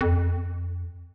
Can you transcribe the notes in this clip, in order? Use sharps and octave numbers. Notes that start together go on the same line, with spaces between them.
F2